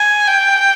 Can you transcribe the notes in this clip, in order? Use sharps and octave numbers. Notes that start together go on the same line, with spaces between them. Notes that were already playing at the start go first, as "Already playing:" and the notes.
Already playing: G#5
G5